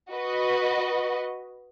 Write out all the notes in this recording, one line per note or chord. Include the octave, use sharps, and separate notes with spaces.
F#4 B4 D#5